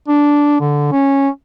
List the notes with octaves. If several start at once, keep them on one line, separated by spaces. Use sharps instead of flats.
D4
D3
C#4